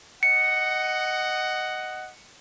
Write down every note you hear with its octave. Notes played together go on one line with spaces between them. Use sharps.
D#5 F#5 C#7